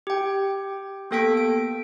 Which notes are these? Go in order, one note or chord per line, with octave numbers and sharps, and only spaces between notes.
G4 G5
A#3 B3 A4 G5 B6 D7
D7